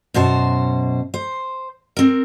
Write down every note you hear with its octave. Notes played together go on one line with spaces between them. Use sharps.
F#2 B2 C5 A5
C5
C4 A#4